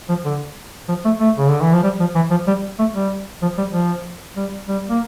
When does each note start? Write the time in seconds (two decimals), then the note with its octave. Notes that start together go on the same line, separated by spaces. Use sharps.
0.09 F3
0.25 D3
0.89 F3
1.05 A3
1.20 A3
1.38 C#3
1.49 D3
1.62 E3
1.73 F3
1.83 G3
2.00 F3
2.15 E3
2.31 F3
2.47 G3
2.79 A3
2.94 G3
3.42 F3
3.58 G3
3.73 F3
4.36 G3
4.68 G3
4.90 A#3